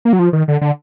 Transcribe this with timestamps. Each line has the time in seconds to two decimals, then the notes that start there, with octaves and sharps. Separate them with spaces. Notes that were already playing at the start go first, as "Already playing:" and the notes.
0.05 A#3
0.13 F#3
0.19 F3
0.33 D#3
0.48 D3
0.61 D3